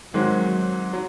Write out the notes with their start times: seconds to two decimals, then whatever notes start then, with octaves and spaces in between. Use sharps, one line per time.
0.13 G#2 D#3 F#3 G#3 C4
0.93 F#3